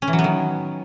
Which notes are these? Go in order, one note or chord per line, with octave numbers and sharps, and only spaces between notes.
C#4
E3
F#3
B3
D#3